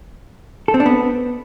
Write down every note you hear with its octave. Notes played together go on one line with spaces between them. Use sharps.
A4
C4
D4
B3